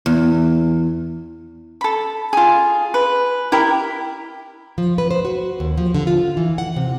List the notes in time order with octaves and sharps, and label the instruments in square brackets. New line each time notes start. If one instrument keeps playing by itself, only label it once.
[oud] E2
[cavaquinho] A4 B5
F4 G#4
B4
E4 G4 A#4
[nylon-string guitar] F3
B4
C5
F#4
D#2
F3
D3
F4
E3
F#5
C3